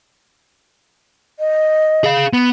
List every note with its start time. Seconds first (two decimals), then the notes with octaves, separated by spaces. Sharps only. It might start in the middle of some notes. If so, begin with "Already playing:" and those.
1.39 D#5
2.04 G#4 F5
2.33 B3